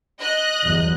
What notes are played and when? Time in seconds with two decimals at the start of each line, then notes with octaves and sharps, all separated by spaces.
0.20 D#5 F#6
0.64 G1 E2 F#3